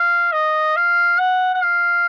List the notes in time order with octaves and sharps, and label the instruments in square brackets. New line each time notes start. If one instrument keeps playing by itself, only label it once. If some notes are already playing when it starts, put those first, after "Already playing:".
Already playing: [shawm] F5
D#5
F5
F#5
F#5
F5